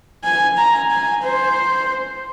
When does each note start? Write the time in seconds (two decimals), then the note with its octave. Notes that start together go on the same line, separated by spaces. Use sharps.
0.24 G#5
0.58 A#5
0.91 G#5
1.23 C5